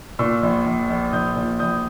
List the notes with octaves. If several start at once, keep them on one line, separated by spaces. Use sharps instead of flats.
A#2 C#6 E6
A#1
A#1
A#1
A#1 D#6 G6
A#2
A#1 D#6 G6